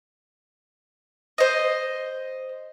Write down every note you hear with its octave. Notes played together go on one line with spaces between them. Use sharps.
C5 D#5